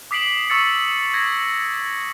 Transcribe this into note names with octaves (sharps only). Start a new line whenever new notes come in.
D6 D#6 B6 C7 D7 F#7
C#6 E6 A6 C#7
G#6 A#6